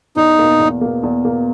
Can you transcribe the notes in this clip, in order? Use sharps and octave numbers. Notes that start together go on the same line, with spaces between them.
E2 D#4
B2 A#3
E2
B2 A#3
E2
B2 A#3